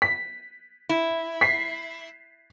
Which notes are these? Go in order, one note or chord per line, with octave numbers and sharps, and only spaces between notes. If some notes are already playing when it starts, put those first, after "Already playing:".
B6
E4
B6 C7